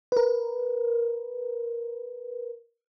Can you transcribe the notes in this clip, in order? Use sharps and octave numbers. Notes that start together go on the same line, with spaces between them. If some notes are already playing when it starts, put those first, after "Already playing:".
A#4 B4